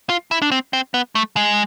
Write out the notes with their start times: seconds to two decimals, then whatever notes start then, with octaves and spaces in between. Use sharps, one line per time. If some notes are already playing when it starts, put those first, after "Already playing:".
0.09 F4
0.31 E4
0.42 D4
0.52 C4
0.73 C4
0.94 B3
1.15 A3
1.36 G#3